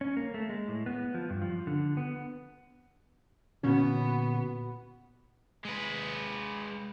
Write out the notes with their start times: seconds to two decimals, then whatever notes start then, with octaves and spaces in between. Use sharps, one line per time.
0.01 C#4
0.17 A#3
0.34 A3
0.49 G#3
0.68 A2
0.86 B3
1.14 F3
1.30 G2
1.42 F3
1.67 D3
1.97 B3
3.63 A#2 D3 E3 B3 C#4 F#4
5.65 G#3 B4